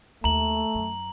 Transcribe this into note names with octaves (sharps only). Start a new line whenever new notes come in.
D#2 A3 A#5 F#7
F#2